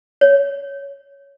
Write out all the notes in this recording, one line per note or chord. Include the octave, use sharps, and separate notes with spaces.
C#5